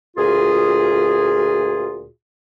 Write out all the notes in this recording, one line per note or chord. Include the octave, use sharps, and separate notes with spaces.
D2 A#2 F4 F#4 G#4